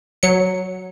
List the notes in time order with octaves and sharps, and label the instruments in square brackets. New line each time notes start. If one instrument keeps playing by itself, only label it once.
[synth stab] F#3 C#7